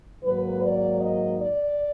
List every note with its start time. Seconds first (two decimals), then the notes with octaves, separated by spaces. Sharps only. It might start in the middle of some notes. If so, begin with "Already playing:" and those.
0.24 G#2 D#3 F#3 A#3 B4
0.62 D5
1.01 D#5
1.40 D5